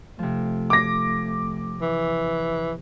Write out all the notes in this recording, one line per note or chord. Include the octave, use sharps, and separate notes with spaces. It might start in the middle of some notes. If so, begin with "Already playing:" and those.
C3 F3 A3
D6 A#6
E3